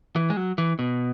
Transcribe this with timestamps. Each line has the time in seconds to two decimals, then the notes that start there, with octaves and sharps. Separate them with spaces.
0.16 E3
0.30 G#3
0.37 F#3
0.58 E3
0.79 B2